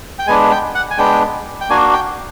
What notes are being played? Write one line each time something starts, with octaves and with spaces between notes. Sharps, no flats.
G5
G#3 B3 D4 G#5
G5
F#5
G#5
G#3 B3 D4 G5
G5
A#3 D4 F#4 G#5
G5